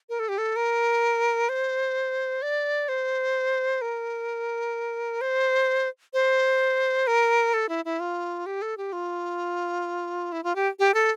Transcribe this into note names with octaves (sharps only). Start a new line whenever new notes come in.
A#4
A4
G4
A4
A#4
C5
D5
C5
A#4
C5
C5
A#4
A4
E4
E4
F4
G4
A4
G4
F4
E4
F4
G4
G4
A4